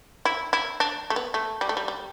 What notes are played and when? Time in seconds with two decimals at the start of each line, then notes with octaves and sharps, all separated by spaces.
0.25 E4
0.53 E4
0.80 D4
1.10 A3
1.16 B3
1.34 A3
1.61 G3
1.69 A3
1.77 G3
1.88 G3